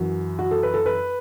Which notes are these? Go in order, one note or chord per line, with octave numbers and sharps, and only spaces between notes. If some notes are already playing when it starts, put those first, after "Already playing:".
Already playing: F#2 E3 F#4
F#4
A4
B4
A4
B4